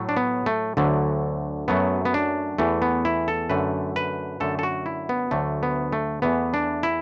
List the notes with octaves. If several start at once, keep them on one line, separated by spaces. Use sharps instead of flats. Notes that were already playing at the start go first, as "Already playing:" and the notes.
Already playing: A2 F#3 A3
D4
B3
A3
D2 D3 F#3 A3
F#2 F#3 A3 B3
B3
D4
E2 E3 A3
B3
E4
A4
F#2 D3 A3 B4
B4
F#2 D3 A3 A4
A4
F#4
E4
B3
D2 D3 F#3 A3
B3
A3
E2 E3 A3 B3
D4
E4